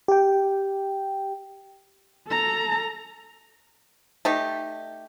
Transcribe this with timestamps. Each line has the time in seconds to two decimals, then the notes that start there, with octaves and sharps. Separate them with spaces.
0.08 G4 G5
2.27 A4 A#5
4.25 A3 D#4 G4